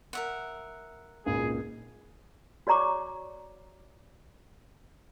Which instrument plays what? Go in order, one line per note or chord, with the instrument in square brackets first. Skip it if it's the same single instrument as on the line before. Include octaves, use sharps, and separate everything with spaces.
[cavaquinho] A#4 E5 F#5
[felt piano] G#1 C#2 A#2 [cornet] G#4
[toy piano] F#4 C#5 D5 A#5 C#6 D6